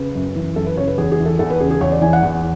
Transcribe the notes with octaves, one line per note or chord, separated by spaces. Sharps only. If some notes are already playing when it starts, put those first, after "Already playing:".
Already playing: C#3 B4
F#2
E3
F#2 A4
B4
C#3 C#5
B4
E2 G#4
G#4
E3
A4
E2 A4
B4
C#3 G#4
G#4
E2 C#5
D5
E3 G#5
F#5
E2